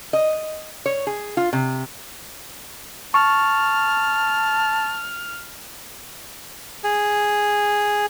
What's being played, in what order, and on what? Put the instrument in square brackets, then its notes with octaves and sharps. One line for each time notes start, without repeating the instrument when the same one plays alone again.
[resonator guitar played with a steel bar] D#5
C#5
G#4
F4
C3
[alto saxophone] A5 [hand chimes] C#6 [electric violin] F6
[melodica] G#4